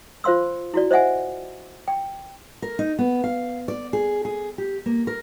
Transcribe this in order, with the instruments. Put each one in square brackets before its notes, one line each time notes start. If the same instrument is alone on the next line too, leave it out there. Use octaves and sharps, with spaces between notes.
[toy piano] F4 C5 F5 C6 E6
E4 F#4 D5
C5 D#5 E5 F#5 G#5
G5
[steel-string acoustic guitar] A#4
D#4
B3
F5
D5
G#4
G#4
G4
A#3
A#4